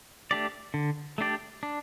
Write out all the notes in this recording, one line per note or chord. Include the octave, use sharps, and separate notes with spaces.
A3 D4 G4 D5
D3
A3 D4 G4 D5
D4